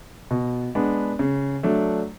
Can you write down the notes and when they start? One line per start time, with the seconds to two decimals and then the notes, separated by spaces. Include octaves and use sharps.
0.31 B2
0.75 G#3 B3 D4
1.19 C#3
1.63 F#3 A3 D4